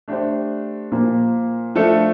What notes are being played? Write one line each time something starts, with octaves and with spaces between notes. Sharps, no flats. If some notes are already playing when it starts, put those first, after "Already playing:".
A3 D4 G4 C5
A#2 F3 A#3
F3 A3 D4 A4